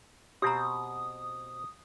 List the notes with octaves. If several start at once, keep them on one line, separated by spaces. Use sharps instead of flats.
B2 C4 G4 A#5 D#6